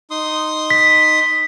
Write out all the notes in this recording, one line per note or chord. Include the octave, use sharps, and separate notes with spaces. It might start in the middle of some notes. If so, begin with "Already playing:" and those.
D#4 C6 D#6
B6